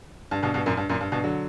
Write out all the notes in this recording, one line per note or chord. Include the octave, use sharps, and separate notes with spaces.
G2
G2 B2
G2 B2
F#2 A#2
G2
F#2 A#2
G2
G2 B2
D3 F#3